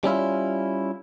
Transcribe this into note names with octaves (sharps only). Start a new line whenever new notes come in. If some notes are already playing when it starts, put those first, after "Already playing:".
G3 C#4 E4 F4